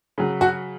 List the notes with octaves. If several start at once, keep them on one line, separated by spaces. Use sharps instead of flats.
C#3 F#3
F#4